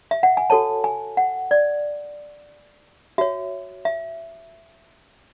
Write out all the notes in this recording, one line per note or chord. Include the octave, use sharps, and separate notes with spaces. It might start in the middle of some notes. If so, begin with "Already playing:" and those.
E5
F#5
G#5
F#4 A4 C#5 A5
G#5
F#5
D5
F#4 C#5 E5
E5